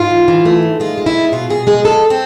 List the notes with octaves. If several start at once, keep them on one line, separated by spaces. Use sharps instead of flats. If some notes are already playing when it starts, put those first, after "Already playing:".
Already playing: G#2 F4
E3
E3
A3
G#2
G#3 F4
G#3
E4
B2
B2 F4
B2 G#4
G#3 G#4
F2 A4
C4